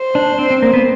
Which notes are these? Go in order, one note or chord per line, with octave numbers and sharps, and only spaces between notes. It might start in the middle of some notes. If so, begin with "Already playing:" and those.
Already playing: C5
D4
C4
C4
A#3
B3